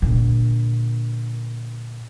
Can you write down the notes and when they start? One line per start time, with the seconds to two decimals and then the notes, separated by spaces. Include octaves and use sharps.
0.02 A#2 D3